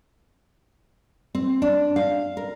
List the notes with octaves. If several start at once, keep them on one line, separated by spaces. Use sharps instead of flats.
C4
D4
F5
A#4